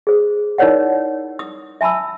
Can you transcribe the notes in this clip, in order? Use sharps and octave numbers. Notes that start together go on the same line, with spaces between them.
G#4 C5
D#4 E4 A#4 C#5 D5 F#5
D#6
E5 G#5 A5 B5 E6